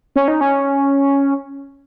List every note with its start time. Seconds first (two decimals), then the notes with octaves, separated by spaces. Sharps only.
0.16 C#4
0.28 D#4
0.41 C#4